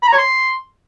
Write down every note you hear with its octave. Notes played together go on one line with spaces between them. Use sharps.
B5
A#5
C#5
C6